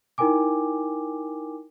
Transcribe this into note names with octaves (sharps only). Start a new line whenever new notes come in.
D#4 E4 A#4 G5 G#5 D6